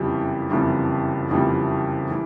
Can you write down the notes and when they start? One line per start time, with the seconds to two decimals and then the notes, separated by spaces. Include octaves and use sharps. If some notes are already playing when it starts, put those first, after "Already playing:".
Already playing: F#1 F2 C3 E3 G3
0.51 F#1 F2 C3 E3 G3
1.30 F#1 F2 C3 E3 G3
2.11 E3 G3